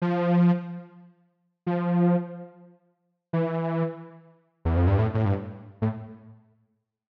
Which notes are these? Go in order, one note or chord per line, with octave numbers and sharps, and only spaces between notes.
F3
F3
E3
E2
F2
G2
A2
A2
G2
A2